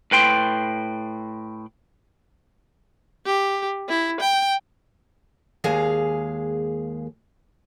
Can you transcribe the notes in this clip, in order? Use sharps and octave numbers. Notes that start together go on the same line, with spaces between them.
A2 B4 G5 C6
G4
E4
G5
D#2 G#3 G#4 F5